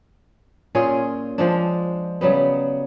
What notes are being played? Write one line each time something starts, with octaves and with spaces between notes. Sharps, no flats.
A#2 C#4 F4 G#4
F3 G#3 D4
C#3 F#3 G3 B3